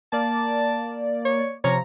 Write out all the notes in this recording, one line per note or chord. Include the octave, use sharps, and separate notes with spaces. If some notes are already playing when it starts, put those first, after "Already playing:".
A#3 D5 A5
C#5
C3 F3 C#5 A#5